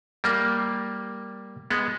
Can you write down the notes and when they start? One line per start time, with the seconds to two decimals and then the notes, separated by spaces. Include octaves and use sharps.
0.24 G3 A#3
1.70 G#3 B3